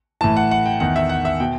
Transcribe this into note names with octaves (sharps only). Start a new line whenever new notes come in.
A2 E3 A5
F#5
F#5
G5
E2 D#3 F#5
E5
F#5
E5
B2 G5